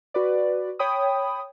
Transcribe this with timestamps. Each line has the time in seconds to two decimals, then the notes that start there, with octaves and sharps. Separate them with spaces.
0.14 F#4 B4 D5
0.79 C#5 G5 B5 D#6